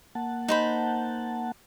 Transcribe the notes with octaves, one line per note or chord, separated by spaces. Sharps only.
A#3 F#5 A5
D#4 C5 B5